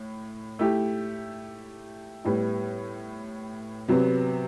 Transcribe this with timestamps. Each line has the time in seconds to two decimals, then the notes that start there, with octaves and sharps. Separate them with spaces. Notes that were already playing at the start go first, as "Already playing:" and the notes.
Already playing: A2
0.59 A3 E4 G4
2.24 A2 G3 B3 E4
3.88 C3 F#3 B3